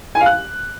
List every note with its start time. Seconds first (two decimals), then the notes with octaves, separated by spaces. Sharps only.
0.15 G#5
0.20 F5
0.26 F#6